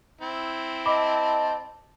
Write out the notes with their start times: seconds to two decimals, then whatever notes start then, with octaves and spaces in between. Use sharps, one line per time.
0.21 C4 E4
0.86 D#5 A5 B5 D6